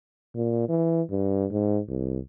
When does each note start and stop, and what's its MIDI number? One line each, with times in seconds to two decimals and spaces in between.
0.35 0.66 46
0.69 1.02 52
1.10 1.46 43
1.51 1.80 44
1.89 2.19 36